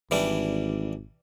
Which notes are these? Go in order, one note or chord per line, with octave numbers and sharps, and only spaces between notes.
G#1 E3 G3 D4